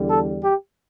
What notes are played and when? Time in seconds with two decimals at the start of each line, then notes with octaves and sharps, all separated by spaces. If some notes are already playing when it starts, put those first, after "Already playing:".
Already playing: E2 D3 G3
0.09 A4
0.43 G4